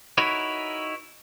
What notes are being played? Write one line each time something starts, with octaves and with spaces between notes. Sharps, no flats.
D#4 E4 F#4 A#4 B4 C#5